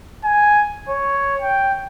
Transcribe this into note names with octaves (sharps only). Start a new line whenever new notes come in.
G#5
C#5
G5